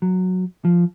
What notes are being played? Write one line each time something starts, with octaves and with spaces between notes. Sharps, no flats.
F#3
F3